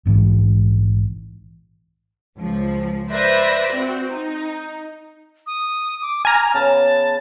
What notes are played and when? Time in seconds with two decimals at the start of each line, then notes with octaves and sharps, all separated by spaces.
0.05 A#1 G#2 B2 E3
2.38 C#2 F3
3.11 B4 C5 D5 E5 A#6
3.73 C4 F#4
4.11 D#4
5.47 D#6
6.02 D6
6.25 G#5 A#5 F6
6.54 C#3 B3 A5